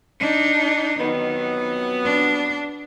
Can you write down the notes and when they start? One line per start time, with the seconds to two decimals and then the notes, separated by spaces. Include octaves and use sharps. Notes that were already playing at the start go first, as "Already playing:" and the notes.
0.20 D4 D#4
0.99 F2 D#3 F#3 B3
2.05 D4